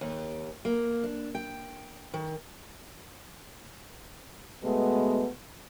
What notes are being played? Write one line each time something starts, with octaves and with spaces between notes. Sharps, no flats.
D#2
A#3
D4
G5
D#3
B2 G#3 A3 B3